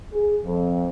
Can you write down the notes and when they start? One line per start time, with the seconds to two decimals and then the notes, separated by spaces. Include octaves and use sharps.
0.13 G#4
0.45 F2